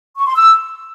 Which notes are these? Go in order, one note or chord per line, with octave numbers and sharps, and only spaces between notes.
C#6
C6
E6